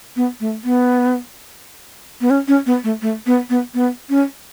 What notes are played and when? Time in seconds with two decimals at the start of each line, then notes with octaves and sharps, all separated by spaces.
0.16 B3
0.40 A3
0.64 B3
2.21 B3
2.30 C#4
2.48 C#4
2.66 B3
2.84 A3
3.02 A3
3.26 B3
3.50 B3
3.74 B3
4.09 C#4